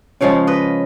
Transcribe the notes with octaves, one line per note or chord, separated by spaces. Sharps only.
C#3 F3 G#3 C#5 F5
B4 D#5